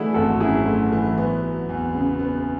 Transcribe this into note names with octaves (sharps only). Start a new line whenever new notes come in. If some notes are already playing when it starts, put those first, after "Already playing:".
Already playing: E3 A3 D4 E4 F#4 G#4
G#1 F#4 A4
F#2 E4 G#4
A3
E3
B3
F#3
E2
C#3
B3